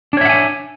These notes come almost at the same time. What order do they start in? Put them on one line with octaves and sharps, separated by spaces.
D4 C#5 E5 F#5 G#5